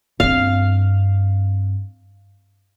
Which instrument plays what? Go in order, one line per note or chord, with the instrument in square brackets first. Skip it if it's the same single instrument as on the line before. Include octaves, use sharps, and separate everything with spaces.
[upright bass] G2 C4 [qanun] F5